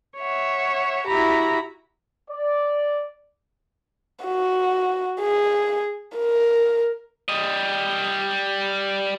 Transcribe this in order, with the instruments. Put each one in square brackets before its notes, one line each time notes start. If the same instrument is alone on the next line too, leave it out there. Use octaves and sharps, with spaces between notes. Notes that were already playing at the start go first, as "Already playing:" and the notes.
[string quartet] C#5 E5 F#5
E4 F#4 G4 A#5 B5
[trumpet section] D5
[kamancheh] F#4
G#4
A#4
[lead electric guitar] G3 D#5